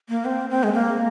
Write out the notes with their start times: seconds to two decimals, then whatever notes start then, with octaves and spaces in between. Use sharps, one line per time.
0.09 A#3
0.25 C4
0.50 C4
0.63 G#3
0.73 A#3